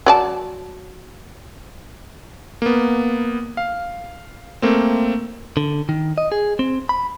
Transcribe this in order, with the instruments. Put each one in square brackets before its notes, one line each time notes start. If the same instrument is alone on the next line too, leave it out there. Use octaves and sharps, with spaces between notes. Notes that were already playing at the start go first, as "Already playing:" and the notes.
[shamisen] F#3 D5 A5
[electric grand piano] A#3 B3
F5
A3 A#3 C4
[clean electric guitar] D3
D#3
D#5
G#4
C4
B5